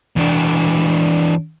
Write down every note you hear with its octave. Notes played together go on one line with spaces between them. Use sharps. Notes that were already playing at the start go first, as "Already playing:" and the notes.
E2 D4